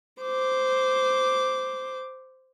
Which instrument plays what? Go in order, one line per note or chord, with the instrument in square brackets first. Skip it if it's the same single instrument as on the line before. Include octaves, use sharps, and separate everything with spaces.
[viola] C5 D6